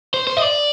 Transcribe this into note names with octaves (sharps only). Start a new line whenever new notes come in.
C5
C5
D#5
D5